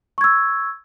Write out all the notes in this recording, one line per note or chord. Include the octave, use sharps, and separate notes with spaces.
C#6 E6 G#6